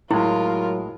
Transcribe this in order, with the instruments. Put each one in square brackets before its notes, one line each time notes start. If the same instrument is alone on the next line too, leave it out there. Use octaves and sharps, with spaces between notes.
[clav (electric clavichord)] A2 G#3 [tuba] F#3 [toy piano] E4 [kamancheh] F4 A#4